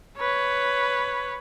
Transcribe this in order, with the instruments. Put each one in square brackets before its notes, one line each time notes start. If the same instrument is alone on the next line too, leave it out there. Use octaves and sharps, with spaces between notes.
[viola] B4 C#5